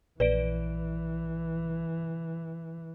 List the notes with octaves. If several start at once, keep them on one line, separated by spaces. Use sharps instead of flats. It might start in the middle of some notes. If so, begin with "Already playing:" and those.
A#1 E3 B4 D5 D7